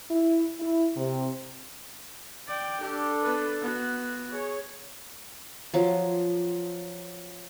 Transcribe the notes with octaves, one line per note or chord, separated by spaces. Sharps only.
E4
E4
C3
D5 G5
D4 G4 A4
B3 B4
B3 F#4
G#4 C#5
F3 F#3